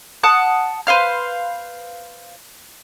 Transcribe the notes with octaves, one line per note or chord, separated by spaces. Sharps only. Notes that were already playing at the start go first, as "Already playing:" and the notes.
F#5 A5 D#6 F#6
B4 C5 F5 F6